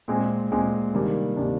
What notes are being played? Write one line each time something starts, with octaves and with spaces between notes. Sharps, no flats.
A#2 G#3 C4
A#2 G#3 C4
C3 D#3 G3 A#3 D4
C3 D#3 G3 A#3 D4